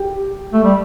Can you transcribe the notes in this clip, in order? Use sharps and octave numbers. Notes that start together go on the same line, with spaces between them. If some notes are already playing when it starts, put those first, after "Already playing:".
Already playing: G4
A3
G3